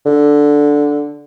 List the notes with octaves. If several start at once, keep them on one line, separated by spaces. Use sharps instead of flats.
D3